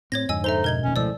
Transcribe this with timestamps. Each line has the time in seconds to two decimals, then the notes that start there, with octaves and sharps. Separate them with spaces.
0.12 A2 C4 C#5 G#6 A#6
0.29 F2 G#2 D3 D#5 G#5 E6
0.44 D#4 A4 C5 E5 A#5 G7
0.64 B2 A#4 D#5 G#6 G7
0.84 F1 D#2 C#4
0.96 C#2 A2 F3 D5 E6